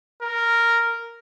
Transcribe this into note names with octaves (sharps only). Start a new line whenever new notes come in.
A#4